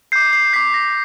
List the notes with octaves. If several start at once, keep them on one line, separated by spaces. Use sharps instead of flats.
D6 G6 C7
C7
D6 G6 B6
A#6